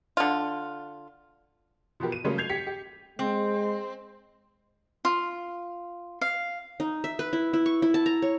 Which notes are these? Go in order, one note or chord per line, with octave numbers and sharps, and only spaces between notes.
D3 F4
B2 F3 B3 G4 A#4
D#7
C#3 F#3 G3 A3 A#3 C#4
G6 G#6 C7 F7
G4 B6 C#7
G4
G#3 C4
F4
F5
D#4
E5
B4
E4
E4
C#6
E4
A5
A#5
C#5